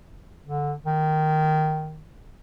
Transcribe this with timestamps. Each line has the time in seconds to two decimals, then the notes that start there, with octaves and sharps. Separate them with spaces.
0.44 D3
0.86 D#3